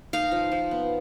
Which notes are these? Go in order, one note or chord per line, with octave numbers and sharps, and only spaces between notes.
D#4 F5
F3
F3
B3